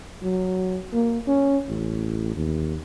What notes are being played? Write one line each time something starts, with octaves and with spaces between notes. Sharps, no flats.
F#3
A#3
C#4
A1
D#2